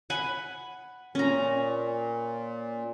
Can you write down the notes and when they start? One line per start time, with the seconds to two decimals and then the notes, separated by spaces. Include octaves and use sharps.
0.10 F#5 G#5 B5
1.15 A#2 C#4 A#5